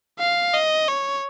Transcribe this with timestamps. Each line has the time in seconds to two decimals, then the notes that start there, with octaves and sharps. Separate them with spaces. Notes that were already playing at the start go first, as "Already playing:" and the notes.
0.19 F5
0.54 D#5
0.88 C#5